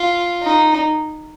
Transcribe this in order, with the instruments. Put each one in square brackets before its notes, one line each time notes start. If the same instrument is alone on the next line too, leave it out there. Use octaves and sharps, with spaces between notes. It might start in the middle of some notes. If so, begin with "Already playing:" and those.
Already playing: [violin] F4
D#4